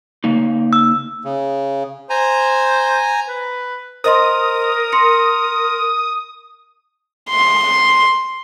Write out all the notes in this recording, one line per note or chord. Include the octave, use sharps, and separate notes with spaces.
C#3 A#3 D#4
E6
C#3
C5 G#5 A#5
B4
A#4 C5 D#5 C6 D#6
C6 A#6 C#7
C6